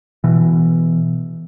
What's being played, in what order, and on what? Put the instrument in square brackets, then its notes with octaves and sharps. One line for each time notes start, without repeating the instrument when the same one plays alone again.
[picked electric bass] B2 E3